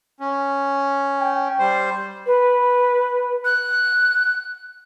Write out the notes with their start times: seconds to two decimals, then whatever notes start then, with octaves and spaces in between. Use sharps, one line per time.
0.20 C#4
1.20 G5
1.59 G3 C5
2.26 B4
3.45 F#6